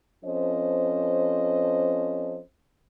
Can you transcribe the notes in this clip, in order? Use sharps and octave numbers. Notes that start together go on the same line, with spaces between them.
F3 C4 C#4 A4 C5 D#5